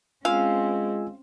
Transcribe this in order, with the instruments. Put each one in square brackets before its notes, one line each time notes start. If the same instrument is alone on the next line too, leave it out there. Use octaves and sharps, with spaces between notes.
[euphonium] G#3 [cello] C4 C#4 [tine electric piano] F4 G#5 E6 [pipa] F5